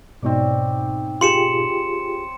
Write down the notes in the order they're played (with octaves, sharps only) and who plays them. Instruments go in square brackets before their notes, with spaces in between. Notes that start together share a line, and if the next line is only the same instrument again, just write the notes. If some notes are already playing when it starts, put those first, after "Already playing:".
[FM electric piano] G#2 B2 D#4 [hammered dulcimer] C4 C#5 D5
[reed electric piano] F4 G4 G#4 [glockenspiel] C6 C#7 E7